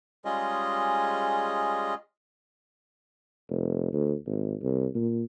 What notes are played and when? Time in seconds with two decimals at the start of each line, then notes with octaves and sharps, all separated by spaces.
0.25 G3 G#3 C#4 F4 G#4 D#5
3.50 F1
3.93 D2
4.27 G#1
4.62 C2
4.95 A#2